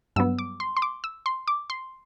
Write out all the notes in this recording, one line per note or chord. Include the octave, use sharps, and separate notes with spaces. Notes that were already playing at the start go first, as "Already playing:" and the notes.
G2 F#3 B3 E6
D6
C6
C6
D6
E6
C6
D6
C6